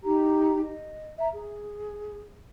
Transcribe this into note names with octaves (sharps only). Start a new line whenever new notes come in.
D#4 G4 A#5
D#5
E5 A#5
G#4